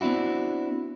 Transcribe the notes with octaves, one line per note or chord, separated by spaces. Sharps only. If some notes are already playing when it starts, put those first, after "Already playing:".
B3 C4 D4 E4 F#4